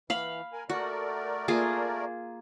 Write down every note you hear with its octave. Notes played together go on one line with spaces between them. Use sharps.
E3 F5 B5
A#4 G#5
A3 F#4 A#4 D5
A#3 F4 G#4